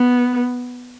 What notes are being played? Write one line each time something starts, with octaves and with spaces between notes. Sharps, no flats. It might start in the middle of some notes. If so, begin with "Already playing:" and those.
Already playing: B3